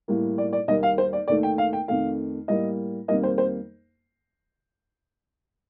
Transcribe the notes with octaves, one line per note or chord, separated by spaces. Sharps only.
A2 G3 A#3
D5
D5
D#2 D#3 G3 A#3 D#5
F5
C5
D5
D#2 D#3 A3 D5
G5
F5
G5
F2 D#3 A3 F5
A2 G3 A#3 D#5
F2 D#3 G3 A#3 D#5
C5
C5